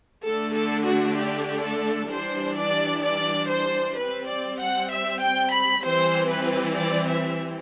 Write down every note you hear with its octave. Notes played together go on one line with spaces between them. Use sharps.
D3 A3 D4 A4
A4
F#4
G4
A4
E3 G3 D4 C5
D5
D5
C5
G3 C4 B4
D5
F#5
E5
G5
B5
E3 G3 C4 C5
B4
D5
E5